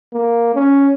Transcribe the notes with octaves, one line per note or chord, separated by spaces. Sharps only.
A#3
C#4